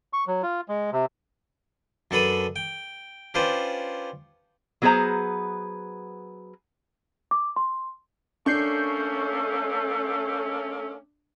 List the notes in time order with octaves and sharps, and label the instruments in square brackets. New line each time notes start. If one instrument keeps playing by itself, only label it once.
[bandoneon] C#6
F#3
F4
G#3
C3
[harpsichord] F#2 D4 A4 B4 B5 D#6
G5
C#4 D4 F4 G4 B4 C5
[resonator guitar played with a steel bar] F#3 B3 G#4 B4 C5 A#5
[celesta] D6
C6
[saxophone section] A3 A#3 C#4 [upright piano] D4 [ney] A4 [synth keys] C#6 G6 C7